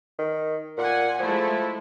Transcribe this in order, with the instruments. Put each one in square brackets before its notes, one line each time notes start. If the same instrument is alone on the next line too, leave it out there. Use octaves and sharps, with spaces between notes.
[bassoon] D#3
[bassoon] A#2 [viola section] F#5 G#5
[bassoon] F3 [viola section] G#3 A3 E4